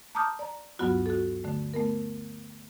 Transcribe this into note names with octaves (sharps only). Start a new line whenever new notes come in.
A5 A#5 D6 D#6 F6 G6
D5 A#5
D2 G2 F#3 B3 F4 F#4
F#4 A4
D3 A3
A3 B3 A#4